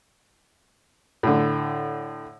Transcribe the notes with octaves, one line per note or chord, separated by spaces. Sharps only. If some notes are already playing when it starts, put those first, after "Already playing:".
A2 D3